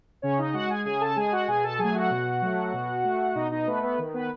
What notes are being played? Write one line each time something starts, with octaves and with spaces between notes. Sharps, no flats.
C#3 C#4 C#5
D#4 D#5
G#3 F#4 F#5
G#4 G#5
C#3 G#4 G#5
A4 A5
G#3 G#4 G#5
F#4 F#5
B2 G#4 G#5
A4 A5
F#3 A3 G#4 G#5
F#4 F#5
B2
F#3 A3
B2
A3
B2 D#4 D#5
D#4 D#5
A3 B3 B4
B3 B4
D#3
B3 B4